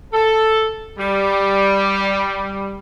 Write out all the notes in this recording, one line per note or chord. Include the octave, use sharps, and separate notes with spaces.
A4
G3